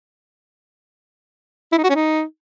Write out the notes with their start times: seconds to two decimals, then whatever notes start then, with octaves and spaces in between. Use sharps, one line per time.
1.72 E4
1.78 D#4
1.84 F#4
1.90 C#4
1.95 D#4